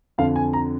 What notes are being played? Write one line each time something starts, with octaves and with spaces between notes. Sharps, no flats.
F2 D3 F5
G#5
A#5